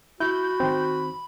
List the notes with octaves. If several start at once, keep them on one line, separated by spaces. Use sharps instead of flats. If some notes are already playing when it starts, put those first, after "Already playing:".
E4 F#4 B5 G6
D#3 C4